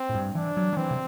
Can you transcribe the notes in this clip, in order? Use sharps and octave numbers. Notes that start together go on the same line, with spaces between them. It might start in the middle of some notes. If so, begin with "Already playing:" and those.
Already playing: C4
A2
G2
E3 D4
F#3
F#3
E3 C4
C3